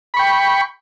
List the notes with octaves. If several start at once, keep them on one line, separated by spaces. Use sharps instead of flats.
G5 B5 C#6